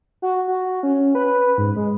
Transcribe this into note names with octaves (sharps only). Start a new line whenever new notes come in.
F#4
F#4
C#4
B4
G#2
G#3